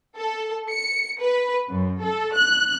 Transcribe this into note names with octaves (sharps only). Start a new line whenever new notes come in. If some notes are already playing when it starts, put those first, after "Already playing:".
A4
C#7
B4
F#2
A4
F#6